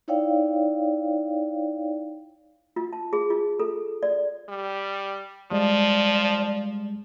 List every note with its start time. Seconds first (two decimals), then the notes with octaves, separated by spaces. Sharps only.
0.08 D#4 E4 C#5 D5 F5 G5
2.76 F4
2.93 A5
3.13 G#4
3.30 F4
3.59 A4
4.03 D5
4.49 G3
5.51 F3 G3 G#3 D5